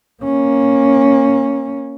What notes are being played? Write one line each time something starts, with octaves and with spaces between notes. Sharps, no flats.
A#3 C#4